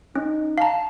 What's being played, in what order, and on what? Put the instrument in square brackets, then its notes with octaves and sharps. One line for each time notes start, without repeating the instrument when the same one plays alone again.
[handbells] C#4 [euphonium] D#4
[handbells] F5 A#5 [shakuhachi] A5